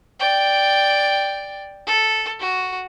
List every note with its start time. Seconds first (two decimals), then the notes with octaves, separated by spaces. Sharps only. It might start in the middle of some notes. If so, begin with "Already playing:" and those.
0.20 D5 G5
1.87 A4
2.40 F#4